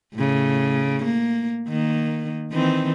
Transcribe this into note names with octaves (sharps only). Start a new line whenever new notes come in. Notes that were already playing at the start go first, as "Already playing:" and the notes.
A2 C#3
A#3
D#3 A#3
D#3 E3 C4